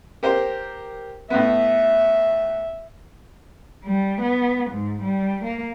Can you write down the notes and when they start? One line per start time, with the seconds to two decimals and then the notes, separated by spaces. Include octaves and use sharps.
0.23 G4 A#4 C5
1.30 A2 B3 E5
3.84 G3
4.22 B3
4.71 G#2
5.03 G3
5.44 A#3